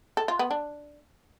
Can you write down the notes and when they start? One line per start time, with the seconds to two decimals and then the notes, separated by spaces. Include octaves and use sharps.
0.17 A4
0.28 F4
0.39 B3
0.51 D4